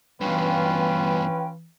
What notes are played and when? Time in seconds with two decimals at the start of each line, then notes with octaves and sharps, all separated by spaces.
0.21 G2 B2 E3 C#4 F4 B4 G5